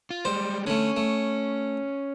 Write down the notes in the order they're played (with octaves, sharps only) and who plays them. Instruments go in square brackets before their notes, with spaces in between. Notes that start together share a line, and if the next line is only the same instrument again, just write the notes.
[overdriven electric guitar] F4
[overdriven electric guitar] G3 G#3 [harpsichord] C5
[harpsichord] D3 A3 [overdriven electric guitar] C#4
[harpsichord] A3